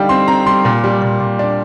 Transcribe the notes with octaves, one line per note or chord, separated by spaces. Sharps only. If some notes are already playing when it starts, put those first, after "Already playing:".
Already playing: D3 G3 D#4 F5 G5
C4 C6
C4 A#5
G3 C6
A#2
G3
A#2
A#2
D4